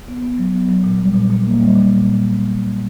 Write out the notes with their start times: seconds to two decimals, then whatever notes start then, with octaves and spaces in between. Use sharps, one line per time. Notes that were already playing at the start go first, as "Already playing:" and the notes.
0.08 B3
0.23 B3
0.38 F#3
0.54 B3
0.69 F#3
0.84 A#2
0.99 G3
1.14 A#2
1.30 A#2
1.45 A#3
1.61 G3
1.76 A#2